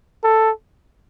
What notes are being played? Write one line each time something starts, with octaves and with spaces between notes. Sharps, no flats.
A4